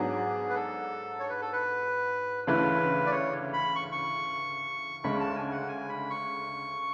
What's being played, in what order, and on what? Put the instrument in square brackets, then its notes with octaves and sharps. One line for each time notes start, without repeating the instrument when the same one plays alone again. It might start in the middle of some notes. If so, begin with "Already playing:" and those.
Already playing: [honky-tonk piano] G#2 F#3 B3 D4 [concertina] G#4
[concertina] B4
A4
C#5
B4
A4
B4
[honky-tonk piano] D2 C#3 E3 A3 [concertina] B4
[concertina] D5
C#5
B5
C#6
C#6
[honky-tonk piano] D2 C#3 G#3 [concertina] B5
[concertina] A5
G#5
F#5
G#5
B5
C#6